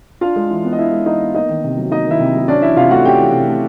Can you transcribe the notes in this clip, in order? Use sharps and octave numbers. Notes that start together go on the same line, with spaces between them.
D4 F4 F5
G#3
E3
B3
D#5
D4 E4 E5
G#3
E3 D#4 D#5
B3
A#3 D#4 D#5
D#3
C3
F#3
A#3 D#4 D#5
D#3 E4 E5
C3
F#3
C#4 D4 D5
E3 E4 E5
C3 F4 F5
A3 F#4 F#5
C#4 G4 G5
E3
C3
A3